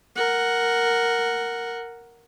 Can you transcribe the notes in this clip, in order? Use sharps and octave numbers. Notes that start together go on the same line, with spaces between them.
A#4 F#5